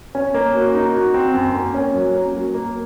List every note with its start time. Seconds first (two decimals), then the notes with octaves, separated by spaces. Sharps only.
0.15 C#4
0.34 A#3
0.54 F#4
0.75 D#4
0.95 F#4
1.14 C4
1.34 F#2
1.54 A#3
1.75 C#4
1.94 F#3
2.15 A#3
2.34 F#3
2.54 A#3